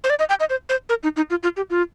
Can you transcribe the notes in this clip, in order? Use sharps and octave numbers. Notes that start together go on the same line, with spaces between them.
C5
D5
D#5
G5
D#5
C5
C5
A#4
D#4
D#4
F4
F4
G4
F4